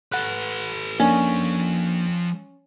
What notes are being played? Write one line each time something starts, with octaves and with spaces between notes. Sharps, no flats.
A4 B4 F#5 F#6
F3 A#3 C#4 D4 A4